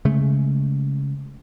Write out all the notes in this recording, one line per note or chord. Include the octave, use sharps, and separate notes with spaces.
C#3 G#3 A3